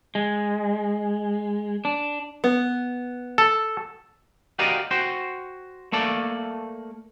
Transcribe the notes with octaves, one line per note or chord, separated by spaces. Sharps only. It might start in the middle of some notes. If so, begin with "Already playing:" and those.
G#3
D4
B3
A4
F#4 G4 A#4 D5 D#5 F5
F#4 C5 G5
A3 A#3 A4 D5